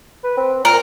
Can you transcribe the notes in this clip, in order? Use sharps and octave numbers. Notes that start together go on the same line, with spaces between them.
B4
C4
A#2 A#4